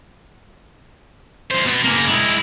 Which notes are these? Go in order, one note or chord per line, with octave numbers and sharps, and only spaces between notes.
E2 C5
B2
C#3 A#3
G#3 E4